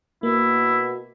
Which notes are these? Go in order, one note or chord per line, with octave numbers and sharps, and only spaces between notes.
B2 A#3 E4